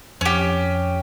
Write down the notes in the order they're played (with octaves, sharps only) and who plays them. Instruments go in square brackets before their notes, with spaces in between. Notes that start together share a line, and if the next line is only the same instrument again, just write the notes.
[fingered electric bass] F2 [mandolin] C#4 G4